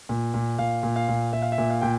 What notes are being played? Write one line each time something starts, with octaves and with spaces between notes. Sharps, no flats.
A#2
A#2
A#2 F5
A#2
F5
A#2
A#2 E5
F5
E5
A#2
F5
A#2 G5